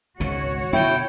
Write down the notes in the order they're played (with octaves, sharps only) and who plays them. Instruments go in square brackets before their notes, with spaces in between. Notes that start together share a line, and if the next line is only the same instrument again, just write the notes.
[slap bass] G#1 C#2 B2 [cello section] F#4 C#5
[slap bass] B2 D3 [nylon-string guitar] E4 [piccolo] G5